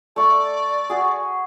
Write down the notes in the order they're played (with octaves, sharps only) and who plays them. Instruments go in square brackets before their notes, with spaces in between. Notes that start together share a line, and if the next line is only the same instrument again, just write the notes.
[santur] A3 C#6 [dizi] D5
[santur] F#4 G#4